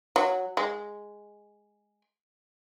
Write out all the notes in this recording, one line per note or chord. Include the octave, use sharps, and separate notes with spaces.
F#3
G#3